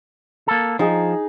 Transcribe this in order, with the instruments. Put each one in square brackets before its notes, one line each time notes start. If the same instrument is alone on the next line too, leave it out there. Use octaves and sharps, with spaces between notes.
[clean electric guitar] A#3 A4
[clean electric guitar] F3 [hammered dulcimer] D#4 G#4